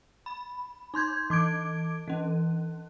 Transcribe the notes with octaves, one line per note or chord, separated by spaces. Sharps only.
B5
D#4 C6 G6 G#6
E3 D6 G#6 D7
E3 C#4